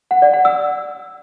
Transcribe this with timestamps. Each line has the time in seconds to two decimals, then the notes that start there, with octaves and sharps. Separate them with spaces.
0.11 F#5
0.22 D5
0.34 F#5
0.45 E6